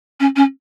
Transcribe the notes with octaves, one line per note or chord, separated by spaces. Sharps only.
C#4
C#4